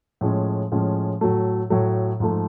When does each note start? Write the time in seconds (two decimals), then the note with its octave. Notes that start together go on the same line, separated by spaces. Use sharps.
0.21 A2 F3 G#3 C#4
0.72 A2 F3 G#3 C#4
1.21 A2 F#3 A3
1.70 A2 F#3 A3
2.20 G#2 F3 A3